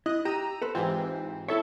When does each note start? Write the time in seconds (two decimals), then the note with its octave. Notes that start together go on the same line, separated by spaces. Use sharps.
0.06 E4 D#5 F#6
0.25 G4 A#5 E6 D#7
0.62 A4 B4 C5
0.75 G#2 E3 C4 F4 G4
1.48 E4 A4 C#5 E5